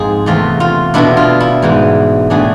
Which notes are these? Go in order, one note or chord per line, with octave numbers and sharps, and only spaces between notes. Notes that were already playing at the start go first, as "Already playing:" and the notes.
Already playing: G#2 F3 G#3 C4 G#4
E2 C3 E3 A3 C4 F4
F4
B2 B3 D4 E4
F4
E4
G#2 E3 B3
A2 E3 B3 D4 G#4